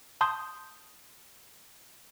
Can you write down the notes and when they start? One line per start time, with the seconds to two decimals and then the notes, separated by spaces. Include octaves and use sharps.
0.21 A5 C6 D#6 G6